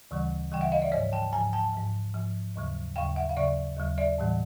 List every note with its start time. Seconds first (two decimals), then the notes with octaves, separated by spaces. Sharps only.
0.11 D2 C#3 E3 G3
0.52 D2 C#3 E3 G3 G5
0.61 E5 F#5
0.72 D#5 F5
0.82 D5 E5
0.92 G#2 F3 C#5 D#5
1.12 G5 A5
1.33 G#2 F3 G#5 A#5
1.53 G5 A5
1.73 G#2 F3
2.14 G#2 F3
2.56 D#2 C#3 F#3
2.96 D#2 C#3 F#3 F5 G5
3.16 E5 F#5
3.29 F5
3.37 D#2 C#3 F#3 D5 E5
3.77 D#2 C#3 F#3
3.98 D5 E5
4.18 A2 E3 G3